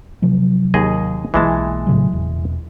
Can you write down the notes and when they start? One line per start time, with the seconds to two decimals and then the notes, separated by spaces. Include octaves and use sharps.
0.22 C3 F3 F#3
0.74 D#2 G#4 D#5
1.34 B1 E3 G#3 A#3 A5
1.87 A2 C#3 F#3
2.13 E1